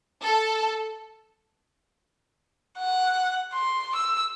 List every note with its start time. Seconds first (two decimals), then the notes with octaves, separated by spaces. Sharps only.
0.24 A4
2.78 F#5
3.53 C6
3.95 E6